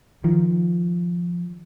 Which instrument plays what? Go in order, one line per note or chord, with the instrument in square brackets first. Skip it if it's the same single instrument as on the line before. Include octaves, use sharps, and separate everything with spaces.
[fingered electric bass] D#3 [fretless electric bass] F3